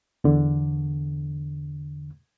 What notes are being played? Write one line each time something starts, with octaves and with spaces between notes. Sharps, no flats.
E2 D3